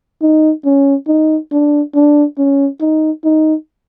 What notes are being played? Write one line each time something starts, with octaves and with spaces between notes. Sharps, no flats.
D#4
C#4
D#4
D4
D4
C#4
D#4
D#4